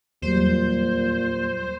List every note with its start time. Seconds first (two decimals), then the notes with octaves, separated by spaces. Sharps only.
0.22 E2 A#2 F#3 G3 C5